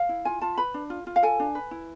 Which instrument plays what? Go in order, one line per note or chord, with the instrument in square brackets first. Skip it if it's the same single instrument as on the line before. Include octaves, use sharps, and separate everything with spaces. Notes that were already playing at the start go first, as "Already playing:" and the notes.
Already playing: [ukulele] F5
E4
F4 G#5
F4 A5
B4 B5
D4
F4
F4
F5
A4 G#5
D4
B4
E4